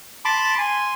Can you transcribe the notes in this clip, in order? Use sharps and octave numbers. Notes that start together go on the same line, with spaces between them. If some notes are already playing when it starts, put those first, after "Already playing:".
A5 B5 C6 D6
G#5 C6